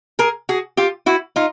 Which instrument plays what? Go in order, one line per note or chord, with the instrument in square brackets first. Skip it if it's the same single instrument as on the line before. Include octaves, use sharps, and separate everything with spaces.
[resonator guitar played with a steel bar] G#4 A#4
F#4 G#4
F4 G4
E4 F#4
D#4 F4